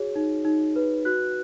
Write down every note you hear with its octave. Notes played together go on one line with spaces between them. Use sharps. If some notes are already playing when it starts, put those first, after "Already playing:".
Already playing: F#4 G#4 C#5
D#4
D#4
B4
F#4 F#6